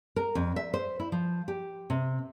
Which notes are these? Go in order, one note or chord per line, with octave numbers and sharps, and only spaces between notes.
A#4
F2
E5
C5
E4
F3
G4
C3